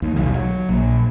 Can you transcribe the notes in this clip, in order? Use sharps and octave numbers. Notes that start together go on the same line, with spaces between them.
D#2
B1
F#3
A#1